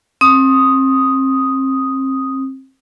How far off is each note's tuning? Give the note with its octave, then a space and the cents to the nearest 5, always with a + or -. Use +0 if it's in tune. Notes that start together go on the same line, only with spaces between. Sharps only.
C4 +35 D#6 +0